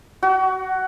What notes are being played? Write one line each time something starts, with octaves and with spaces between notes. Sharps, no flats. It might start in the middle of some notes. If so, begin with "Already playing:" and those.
F#4